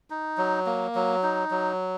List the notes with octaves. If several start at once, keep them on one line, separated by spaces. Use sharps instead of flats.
D#4
F#3
A#3
F#3
D#4
F#3